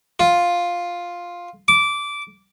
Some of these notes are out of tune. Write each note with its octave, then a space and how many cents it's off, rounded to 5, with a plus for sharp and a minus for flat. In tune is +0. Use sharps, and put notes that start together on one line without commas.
F4 +5
D6 -15